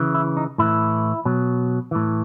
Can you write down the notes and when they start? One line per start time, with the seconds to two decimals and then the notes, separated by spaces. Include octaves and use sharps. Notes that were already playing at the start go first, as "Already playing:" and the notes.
Already playing: C#3 E3
0.14 E4
0.37 D#4
0.58 A2 E3 E4
1.25 B2 F#3
1.91 A2 E3